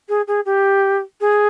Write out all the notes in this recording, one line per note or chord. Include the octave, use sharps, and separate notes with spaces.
G#4
G#4
G4
G#4